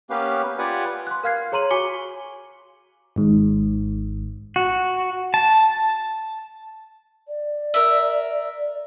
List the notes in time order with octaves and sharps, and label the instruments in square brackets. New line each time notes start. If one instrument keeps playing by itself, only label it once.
[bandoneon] A#3 B3 C#4 G4 B4 F5
F4 G4 B4 D5 F#5 G#5
[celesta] C6 F#6
A#4 F5 F6 G#6 C7
G#4 C#5 A#5 C6 D#7 F#7
F#4 G#5 C#6 D6 C#7 G7
[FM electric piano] G#1 G#2
[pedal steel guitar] F#4
A5
[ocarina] D5
[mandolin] A#4 E5